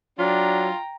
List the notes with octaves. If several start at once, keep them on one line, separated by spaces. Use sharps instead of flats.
F#3 D4 F4 G5 A#5